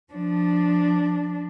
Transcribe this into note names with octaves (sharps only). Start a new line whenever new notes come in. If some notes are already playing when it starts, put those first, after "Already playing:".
F3 D4